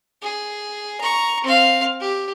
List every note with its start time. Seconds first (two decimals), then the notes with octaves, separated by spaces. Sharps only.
0.22 G#4
1.01 A#5 C#6
1.44 C4 F5
2.01 G4